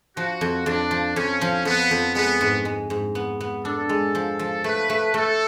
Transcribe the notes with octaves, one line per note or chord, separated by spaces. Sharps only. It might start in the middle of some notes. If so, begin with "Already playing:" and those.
F3 F#4
F2
F2 D4
F3
F2 C#4
F3
F2 B3
F2
G#3 B3
G#2
G#3
G#2
B3
B3
D4 A4
G#3
F3
F3
A3 B4
A3
A3 A4